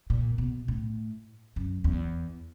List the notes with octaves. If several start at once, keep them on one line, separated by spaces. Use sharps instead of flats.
A#2
B2
A2
F#2
E2